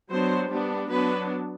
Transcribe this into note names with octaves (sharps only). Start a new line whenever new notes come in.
F#3 B3 D4 C5
G3 B3 D4
F#3 B3 D4 B4